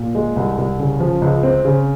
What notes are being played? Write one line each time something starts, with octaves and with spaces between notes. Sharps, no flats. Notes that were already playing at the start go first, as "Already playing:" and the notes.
Already playing: A#2
G#3
C2
C2
C#3
F3
C#2
C4
C#3